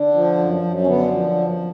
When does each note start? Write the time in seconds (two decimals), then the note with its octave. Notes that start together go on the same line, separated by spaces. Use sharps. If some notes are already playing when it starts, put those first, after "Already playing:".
Already playing: D3
0.14 F3
0.38 F#2
0.62 F#2
0.82 C#4
0.87 D3 B3
1.11 F3
1.35 F#2